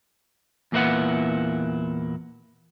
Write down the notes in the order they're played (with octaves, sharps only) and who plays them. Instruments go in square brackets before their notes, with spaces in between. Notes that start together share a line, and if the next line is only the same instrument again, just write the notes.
[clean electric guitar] E2 A#2 A#3 E4 B4 F#5